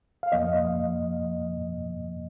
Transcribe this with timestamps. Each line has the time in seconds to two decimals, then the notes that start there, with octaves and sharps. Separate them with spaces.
0.23 F5
0.32 F2 F3 A#3 D#5